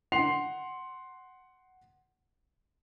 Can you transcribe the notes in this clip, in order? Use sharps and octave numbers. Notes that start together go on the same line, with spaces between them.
F#5 C6 C7 F7